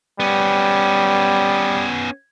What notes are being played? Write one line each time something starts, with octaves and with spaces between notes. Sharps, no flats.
G3 B3 C#4